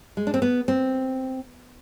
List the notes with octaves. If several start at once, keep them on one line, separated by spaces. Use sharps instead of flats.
G#3
D4
C4
B3
C4